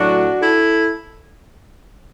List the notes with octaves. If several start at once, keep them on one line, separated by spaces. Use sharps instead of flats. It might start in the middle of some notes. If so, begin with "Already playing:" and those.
Already playing: A2 F#3 D4 F#4
E4 A4